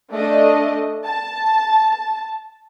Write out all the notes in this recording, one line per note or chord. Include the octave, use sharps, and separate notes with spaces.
A3 D4 D#5
A5